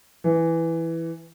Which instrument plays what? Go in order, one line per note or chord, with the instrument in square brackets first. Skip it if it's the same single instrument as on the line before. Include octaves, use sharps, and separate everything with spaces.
[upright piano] E3